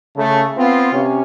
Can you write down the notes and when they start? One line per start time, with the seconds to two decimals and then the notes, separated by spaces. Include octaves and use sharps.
0.16 C#3 A3
0.56 B3 C4 F4
0.92 C3 C#4